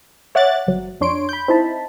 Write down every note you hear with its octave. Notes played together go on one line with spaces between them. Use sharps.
C#5 E5 F#5 D6 F#6 A6
G1 F#3
F2 D4 C#5 C6 D7
B5 G6
C4 D#4 E4 A5 B5